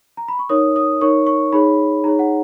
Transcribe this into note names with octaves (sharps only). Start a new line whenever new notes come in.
A#5
B5
C#6
D#4 A#4 C#5 D#6
D#6
D#4 A#4 C#5 C#6
C#6
D#4 G#4 C#5 B5
D#4 G#4 C#5 A#5
F#5